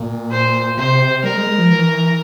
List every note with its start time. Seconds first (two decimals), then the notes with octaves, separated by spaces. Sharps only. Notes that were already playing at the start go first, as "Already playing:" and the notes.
Already playing: A#2
0.32 C5
0.78 C3 C5
1.24 G3 A#4
1.35 G#3
1.46 G#3
1.58 F3
1.70 E3